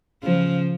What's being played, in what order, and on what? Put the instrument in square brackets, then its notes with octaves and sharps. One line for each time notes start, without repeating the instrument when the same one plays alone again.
[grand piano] C#3 [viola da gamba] F3
[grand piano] C#3